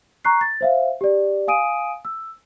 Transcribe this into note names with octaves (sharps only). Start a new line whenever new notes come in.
A#5 C#6 F#6 C7
A6
C5 E5 F5
G4 D5
F5 G#5 D#6 D7 D#7
E6